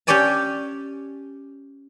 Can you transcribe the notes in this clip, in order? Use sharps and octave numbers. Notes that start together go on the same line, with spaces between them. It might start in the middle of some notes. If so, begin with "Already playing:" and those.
C#4 G4 C#5 D5 G#5 A5